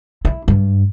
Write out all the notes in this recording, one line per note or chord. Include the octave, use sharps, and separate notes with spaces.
E4
G2